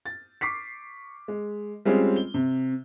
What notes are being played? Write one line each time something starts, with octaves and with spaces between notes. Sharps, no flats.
A6
C#6 D6 B6 C7
G#3
G3 G#3 C4 C#4 F4 G#4
G7
C3